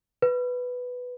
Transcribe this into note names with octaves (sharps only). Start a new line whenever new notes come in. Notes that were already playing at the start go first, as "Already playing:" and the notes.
B4